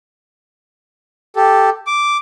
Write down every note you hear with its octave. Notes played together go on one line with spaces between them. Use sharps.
G4 A4
D6